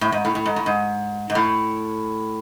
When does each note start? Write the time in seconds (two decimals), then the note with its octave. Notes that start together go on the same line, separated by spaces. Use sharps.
0.01 A2
0.12 G#2
0.25 A2
0.35 A2
0.46 G#2
0.56 A2
0.66 G#2
1.30 G#2
1.35 A2